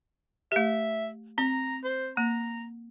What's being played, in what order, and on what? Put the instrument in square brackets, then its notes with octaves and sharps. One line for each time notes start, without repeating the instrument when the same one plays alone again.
[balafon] A3 G4 [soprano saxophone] E5
[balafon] C4 [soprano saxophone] A#5
[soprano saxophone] C5
[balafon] A#3 [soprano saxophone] A#5